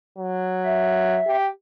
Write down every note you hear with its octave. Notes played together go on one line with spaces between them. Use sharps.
F#3
E5
G4